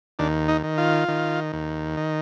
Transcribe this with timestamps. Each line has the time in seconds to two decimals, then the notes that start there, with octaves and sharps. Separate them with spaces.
0.19 D#2 D4
0.48 D#4
0.63 D#3
0.78 F4
1.08 D#3
1.53 D#2
1.97 D#3